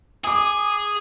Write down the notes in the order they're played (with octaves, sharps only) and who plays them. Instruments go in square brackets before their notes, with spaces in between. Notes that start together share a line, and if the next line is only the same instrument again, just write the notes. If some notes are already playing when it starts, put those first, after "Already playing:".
[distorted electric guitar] G#4 [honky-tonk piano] D6 D#6